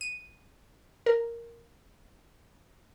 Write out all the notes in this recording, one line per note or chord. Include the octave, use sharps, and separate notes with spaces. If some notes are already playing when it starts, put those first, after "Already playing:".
D#7
A#4